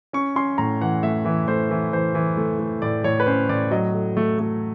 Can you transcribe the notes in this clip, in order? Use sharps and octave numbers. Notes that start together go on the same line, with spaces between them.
C#4 C#6
C#4 C6
A2 A#5
E3 F#5
A3 E5
E3
A3 C5
E3
E3 C5
E3
A3
A3
A2 D5
A2 C#5
B4
C#4 C5
A2 D5
F#3 D#5
A3
A3
A3